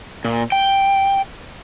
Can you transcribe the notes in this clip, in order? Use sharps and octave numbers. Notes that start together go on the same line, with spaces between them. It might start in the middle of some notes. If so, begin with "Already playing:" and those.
A#2
G5